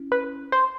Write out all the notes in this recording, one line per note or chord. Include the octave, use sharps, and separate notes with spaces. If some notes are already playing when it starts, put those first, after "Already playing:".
Already playing: C#4 E4
B4
C5